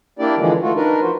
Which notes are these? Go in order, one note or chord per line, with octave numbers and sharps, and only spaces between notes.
A#3 D4 E4 G4 D5
D3 E3 F3 G#3
A3 F4 F#4
D4 D#4 A#4 B4
F3 F#4 C5